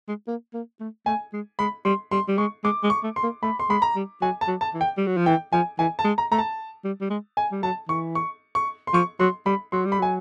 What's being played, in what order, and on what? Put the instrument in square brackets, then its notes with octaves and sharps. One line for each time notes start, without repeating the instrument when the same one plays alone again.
[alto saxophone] G#3
A#3
A#3
A3
[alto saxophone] A3 [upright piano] G#5
[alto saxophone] G#3
[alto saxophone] G#3 [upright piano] B5
[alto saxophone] G3 [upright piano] C6
[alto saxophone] G3 [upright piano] C6
[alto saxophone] G3
[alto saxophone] G#3 [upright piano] C#6
[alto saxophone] G#3 [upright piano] D6
[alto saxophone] G#3
[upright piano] C#6
[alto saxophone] A3
[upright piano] C6
[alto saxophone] A#3
[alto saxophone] A3 [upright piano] B5
[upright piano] C6
[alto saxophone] G#3 [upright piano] B5
[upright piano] A#5
[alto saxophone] G3
[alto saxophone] F#3 [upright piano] G#5
[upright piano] A5
[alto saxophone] F#3
[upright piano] A5
[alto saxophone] E3
[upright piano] G5
[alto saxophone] G3
F#3
F3
[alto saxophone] E3 [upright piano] G5
[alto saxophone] F3 [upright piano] G#5
[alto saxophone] E3 [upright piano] G#5
[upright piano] A5
[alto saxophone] G#3
[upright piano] A#5
[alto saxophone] A3 [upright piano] A#5
[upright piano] A5
[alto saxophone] G3
G3
G#3
[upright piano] G#5
[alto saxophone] G3
[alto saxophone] F#3 [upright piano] A5
[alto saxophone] E3 [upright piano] C#6
[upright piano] C#6
C#6
C6
[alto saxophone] F3 [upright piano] C#6
[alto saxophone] F#3 [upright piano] C6
[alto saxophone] G3 [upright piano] B5
[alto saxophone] F#3 [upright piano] C6
[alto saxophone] G3
[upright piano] B5
[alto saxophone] F#3 [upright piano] G#5